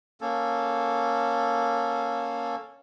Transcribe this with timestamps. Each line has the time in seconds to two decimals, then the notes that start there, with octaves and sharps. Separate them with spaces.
0.21 A#3 C#4 A4